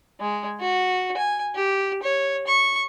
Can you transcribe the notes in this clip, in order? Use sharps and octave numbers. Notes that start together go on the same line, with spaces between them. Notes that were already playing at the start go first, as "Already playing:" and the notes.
G#3
F#4
G#5
G4
C#5
C#6